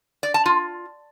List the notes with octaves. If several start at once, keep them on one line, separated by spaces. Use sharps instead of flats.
D5
A5
F4